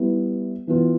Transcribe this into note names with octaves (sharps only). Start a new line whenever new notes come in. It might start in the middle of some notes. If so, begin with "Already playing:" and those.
Already playing: G3 B3 E4
E3 B3 F4